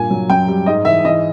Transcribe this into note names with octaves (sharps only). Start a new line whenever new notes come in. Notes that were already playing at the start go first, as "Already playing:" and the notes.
Already playing: G2 A#2 G#5
F#3
F#2 G5
G3
G#2 D#5
E3 E5
E3 D#5